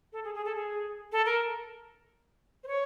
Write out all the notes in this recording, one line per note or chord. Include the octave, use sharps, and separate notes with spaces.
A4
G#4
G#4
A4
G#4
A4
A#4
C5
C#5